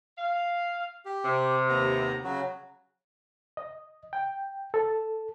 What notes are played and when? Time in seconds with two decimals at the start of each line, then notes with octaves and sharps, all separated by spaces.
0.18 F5
1.05 G4
1.24 C3
1.69 D#2 B3 A#5
2.24 C#3 F#3 F#4
3.57 D#5
4.13 G5
4.74 A4